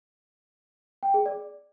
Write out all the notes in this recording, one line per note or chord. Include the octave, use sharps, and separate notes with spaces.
G5
G#4
D5